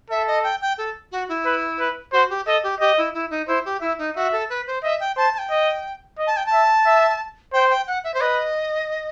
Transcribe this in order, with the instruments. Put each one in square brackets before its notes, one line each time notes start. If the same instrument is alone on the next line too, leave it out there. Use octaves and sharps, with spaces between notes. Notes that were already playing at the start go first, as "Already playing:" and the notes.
[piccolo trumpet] A4 [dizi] E5
[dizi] D#5
G5
G5
A4
F#4
E4
[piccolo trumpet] B4
B4
[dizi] F#4 [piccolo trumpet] C5
[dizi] G4
[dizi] A4 [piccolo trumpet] D#5
[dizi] G4
[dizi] G4 [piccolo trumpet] D#5
[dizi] E4
E4
D#4
[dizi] E4 [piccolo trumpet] C5
[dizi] G4
[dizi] E4 [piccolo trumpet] E5
[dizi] D#4
[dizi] F#4 [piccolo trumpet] E5
[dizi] A4
B4
C5
[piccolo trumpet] D#5 [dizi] E5
[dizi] G5
[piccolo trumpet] C5 [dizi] A5
[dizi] A5
G5
[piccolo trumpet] D#5
D#5
[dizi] A5
G5
A5
[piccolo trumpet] E5
E5
[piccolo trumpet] C5 [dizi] G5
[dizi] G5
F#5
E5
C5
[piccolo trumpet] B4 [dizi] D#5